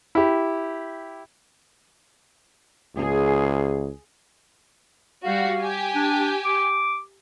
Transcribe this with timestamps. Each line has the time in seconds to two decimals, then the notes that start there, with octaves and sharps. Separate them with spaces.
0.15 E4 G4
2.96 C#2 G#4
5.25 G3 F#4 F5
5.61 G4 G#5
5.95 D4
6.45 D6